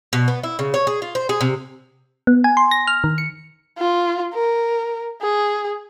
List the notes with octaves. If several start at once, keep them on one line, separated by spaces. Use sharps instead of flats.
B2
B3
E4
C#3
C#5
G#4
F4
C5
G#4
C3
B3
G#5
C6
A#6
F6
D#3
C#7
F4
A#4
G#4